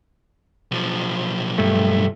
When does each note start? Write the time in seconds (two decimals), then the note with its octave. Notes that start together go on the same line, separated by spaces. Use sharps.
0.71 B1 F3
1.58 G2 A3